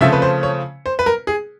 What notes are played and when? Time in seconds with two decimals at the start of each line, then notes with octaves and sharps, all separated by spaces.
0.01 C#3 F3 A3 C4 E5
0.12 B4
0.22 C5
0.43 C#5
0.86 C5
0.99 B4
1.06 A#4
1.27 G#4